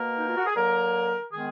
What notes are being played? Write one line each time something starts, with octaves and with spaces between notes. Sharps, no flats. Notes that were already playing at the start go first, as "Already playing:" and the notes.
Already playing: B2 A#3 A#4
D#4
F4
F#4
G#4
D3 F#3 A#3 A#4
D#3 G#3 B3 G#4